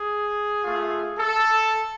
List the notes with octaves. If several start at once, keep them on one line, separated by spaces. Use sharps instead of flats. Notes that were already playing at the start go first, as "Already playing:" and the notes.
Already playing: G#4
A3 F4
A4